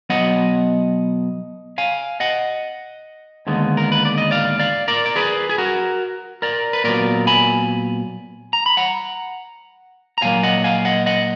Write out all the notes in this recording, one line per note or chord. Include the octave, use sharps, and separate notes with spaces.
B2 F#3 B3 D#5 F#5
F5 G#5
D#5 F#5
D#2 D3 G#3 B3
A#4
B4
D5
D#5
D5 F5
D5 F5
A#4 D5
D5
G#4 B4
G#4
F#4 A#4
A#4 D5
B4
A#2 F#3 B3 A#4 D5
G#5 B5
A#5
B5
F#5 A#5
A#5
A#2 F#3 A#3 F5 G#5
D#5 F#5
F5 G#5
D#5 F#5
D#5 F#5